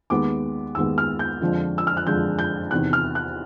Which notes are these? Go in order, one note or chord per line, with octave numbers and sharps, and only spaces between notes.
D#2 D#3 G#3 B3 D6
D#2 D#3 G#3 B3 E6
F6
G6
F2 D3 F3 G#3
E6
F6
F#6
F2 D3 F3 G#3 G6
G6
E2 C3 D#3 F#6
F6
F#6